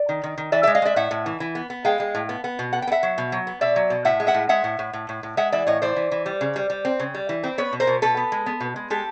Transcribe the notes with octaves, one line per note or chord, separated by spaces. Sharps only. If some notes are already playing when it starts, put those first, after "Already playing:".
Already playing: D5
D#3
D#3
D#3
E3 D5 E5
D5 E5
G#3
D#5 F5
G#3 D5 E5
A2 E5 F#5
A2
E3
E3
B3
B3
G#3 F5 G5
G#3
A2
B3
B3
B2
B3 F#5
G5
B3
E5 F#5
F#3
B2
F#3
B3
B2 D5 E5
F#3
B2
A2 E5 F#5
G#3
E5 F#5
A2
G#3 E5 F#5
A2
A2
A2
A2
A2
G#3 E5 F#5
E3 D5 E5
A2 C#5 D#5
E3 C5 D5
E3
E3
G3
C#3
G3
G3
C4
C#3
G3
E3
C4
B3 B4 C#5
B2
A#4 C5
B2
B2 A4 B4
B3
G#3
B3
B2
G#3
G#3 G4 A4